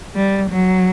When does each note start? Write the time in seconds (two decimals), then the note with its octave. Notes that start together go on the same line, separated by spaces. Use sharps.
0.15 G3
0.50 F#3